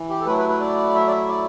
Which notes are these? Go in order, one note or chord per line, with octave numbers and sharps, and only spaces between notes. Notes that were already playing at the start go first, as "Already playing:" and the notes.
Already playing: E3
G4
A4
F#3 A3 E4 B4
B4
B4
D5
E5
D5
E5
D5